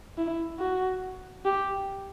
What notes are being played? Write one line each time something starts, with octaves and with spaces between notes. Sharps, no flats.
E4
F#4
G4